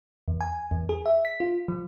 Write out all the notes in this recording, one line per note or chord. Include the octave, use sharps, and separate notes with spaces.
E2
G#5
E2
G#4
E5
B6
F4
F3